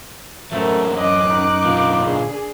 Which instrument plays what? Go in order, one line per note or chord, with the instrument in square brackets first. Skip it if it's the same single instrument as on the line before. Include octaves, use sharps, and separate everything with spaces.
[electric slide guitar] F#3 C4 C#4 [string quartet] G#3 F#4 A#4 [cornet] A3
[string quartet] F#2 D6 F#6 [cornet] D#5
[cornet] D#4
[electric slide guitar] B2 D3 F4
[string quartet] D4 G#4